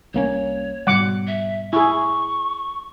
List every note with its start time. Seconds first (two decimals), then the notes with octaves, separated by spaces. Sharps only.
0.14 C2 A#3 C#4 C#5
0.87 G#2 B2 G3 F#5 D6
1.27 E5
1.73 E4 G#4 C#6